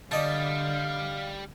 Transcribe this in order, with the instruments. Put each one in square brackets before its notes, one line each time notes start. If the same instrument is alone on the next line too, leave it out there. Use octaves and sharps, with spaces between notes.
[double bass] D3 [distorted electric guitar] G3 [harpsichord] D5 D#5 A5 [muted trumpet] F5